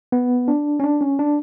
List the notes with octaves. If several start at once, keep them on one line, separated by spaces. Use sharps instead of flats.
B3
D4
C#4
D4
C#4
D4